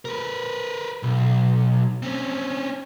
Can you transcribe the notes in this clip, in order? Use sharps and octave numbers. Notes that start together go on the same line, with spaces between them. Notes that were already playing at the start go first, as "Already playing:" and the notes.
A#4 B4
B1
C4 C#4